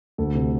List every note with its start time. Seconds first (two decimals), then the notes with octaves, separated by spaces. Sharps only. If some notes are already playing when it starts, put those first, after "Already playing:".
0.18 D2 A4
0.35 C3